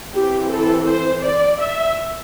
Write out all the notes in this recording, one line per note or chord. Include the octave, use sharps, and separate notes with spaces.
E3 C4 G4
A4
C5
D5
E5